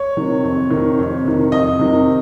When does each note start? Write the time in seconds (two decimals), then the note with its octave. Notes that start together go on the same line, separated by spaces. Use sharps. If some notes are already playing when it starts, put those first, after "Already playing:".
Already playing: C#5
0.17 C3 D#3
0.44 F2
0.71 C3 D#3
0.98 F2
1.25 C3 D#3
1.52 F2 D#5
1.79 C3 D#3